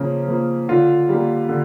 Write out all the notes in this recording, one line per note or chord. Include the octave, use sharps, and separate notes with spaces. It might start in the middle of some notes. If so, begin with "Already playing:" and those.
Already playing: C#3 F3 A#3
F3 A#3
D3 F4
G3 A#3
D3